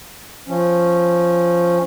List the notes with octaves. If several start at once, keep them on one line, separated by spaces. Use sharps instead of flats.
F3 C#4